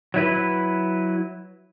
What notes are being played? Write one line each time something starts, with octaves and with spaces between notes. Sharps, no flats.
F#3 E4 B4